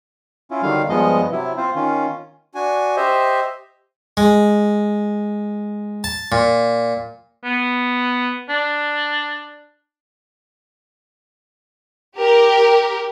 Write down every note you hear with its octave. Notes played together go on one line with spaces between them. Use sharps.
C#4 E4 F4
D3 D#3 F#3 G3 F5
G2 F3 G#3 B3 D#5
C3 F#3 E4
C4 F4 C5
D#3 C#4 F4
D4 F#4 G#5
G4 C5 D#5 E5
G#3
A5
A#2
B3
D4
G4 A#4